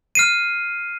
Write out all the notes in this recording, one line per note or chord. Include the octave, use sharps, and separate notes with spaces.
F6 C7 D#7